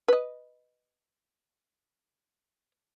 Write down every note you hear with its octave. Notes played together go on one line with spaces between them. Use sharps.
B4 D#5